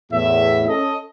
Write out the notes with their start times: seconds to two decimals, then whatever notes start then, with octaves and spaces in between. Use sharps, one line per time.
0.12 E2 A2 E5
0.68 C#4 A4 D#5